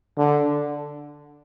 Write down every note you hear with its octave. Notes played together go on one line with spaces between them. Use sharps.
D3